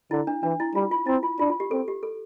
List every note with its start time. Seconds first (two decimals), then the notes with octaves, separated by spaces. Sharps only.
0.11 D3 E4
0.27 D4
0.43 E3 D4
0.60 E4
0.75 G3 F4
0.91 F4
1.07 C4 E4
1.23 F4
1.39 D4 F4
1.50 F4
1.60 G4
1.71 C4 A4
1.88 G4
2.03 A4